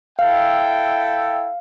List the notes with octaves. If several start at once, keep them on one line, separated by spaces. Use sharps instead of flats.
E4 A4 E5 F5 G5